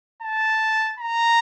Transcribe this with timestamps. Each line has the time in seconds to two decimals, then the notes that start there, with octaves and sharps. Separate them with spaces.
0.23 A5
0.99 A#5